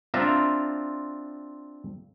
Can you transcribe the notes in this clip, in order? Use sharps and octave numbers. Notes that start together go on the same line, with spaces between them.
C4 D4 F4 E5 A#5